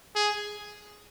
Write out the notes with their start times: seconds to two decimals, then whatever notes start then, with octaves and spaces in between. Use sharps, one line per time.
0.15 G#4